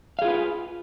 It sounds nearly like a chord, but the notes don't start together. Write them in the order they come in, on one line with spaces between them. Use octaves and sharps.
F5 G#4 F4 B4